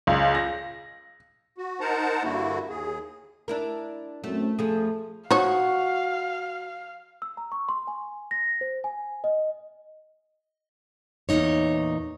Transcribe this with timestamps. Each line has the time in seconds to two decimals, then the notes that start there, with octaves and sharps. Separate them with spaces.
0.07 C#2
0.35 A#6
1.58 F#4
1.80 D#4 A#4 C5 F#5 A5 A#5
2.23 G2 D3 A#3 E4 F#4
2.69 D#2 G#4
3.48 D4 E4 A#4
4.24 F#2 A3 C4
4.59 F2 F3 A3 G#4 A4
5.31 F3 D#4 F#4 C#5 F5
7.22 E6
7.37 A#5
7.52 C#6
7.69 C6
7.87 G#5
8.31 A#6
8.61 C5
8.84 G#5
9.24 D#5
11.29 E2 A#2 D#3 D#4 C#5